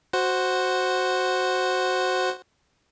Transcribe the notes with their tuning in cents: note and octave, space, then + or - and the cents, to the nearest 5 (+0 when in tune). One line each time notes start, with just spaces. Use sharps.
F#4 +0 C5 +0 F#5 +0